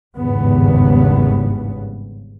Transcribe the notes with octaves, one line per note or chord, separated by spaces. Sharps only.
G#1 E2 G2 C#3 B3